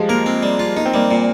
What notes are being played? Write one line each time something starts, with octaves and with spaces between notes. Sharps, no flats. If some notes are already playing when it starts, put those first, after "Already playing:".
Already playing: F3 G3 G#3
A#3 A#4
C4
G3
F4
A#3 D#4
C4
G3 A#3
A#2